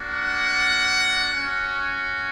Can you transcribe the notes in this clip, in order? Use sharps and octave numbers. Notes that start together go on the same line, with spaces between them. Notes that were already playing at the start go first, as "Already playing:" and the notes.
Already playing: A#3 D4 F#4
F#5
C#4 F#4